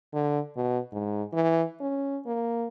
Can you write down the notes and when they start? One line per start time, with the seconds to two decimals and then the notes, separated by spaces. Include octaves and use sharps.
0.14 D3
0.57 B2
0.92 G#2
1.33 E3
1.80 C#4
2.26 A#3